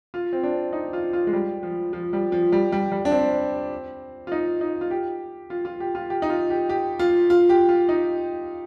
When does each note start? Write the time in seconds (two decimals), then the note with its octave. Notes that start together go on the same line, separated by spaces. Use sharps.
0.14 F4
0.33 C4
0.43 D4
0.73 D#4
0.93 F4
1.13 F4
1.27 G#3
1.33 G3
1.63 F3
1.93 F3
2.13 G3
2.32 F3
2.52 G3
2.72 G3
2.92 G3
3.05 D4
3.11 C4
4.27 F4
4.32 D#4
4.61 D#4
4.81 F4
4.91 G4
5.50 F4
5.65 F4
5.80 G4
5.95 F4
6.10 G4
6.22 D#4
6.30 F4
6.50 G4
6.69 G4
6.99 F4
7.30 F4
7.49 G4
7.69 F4
7.89 D#4